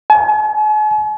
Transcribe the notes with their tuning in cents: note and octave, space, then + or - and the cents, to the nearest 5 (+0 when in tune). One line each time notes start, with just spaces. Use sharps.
G#5 +45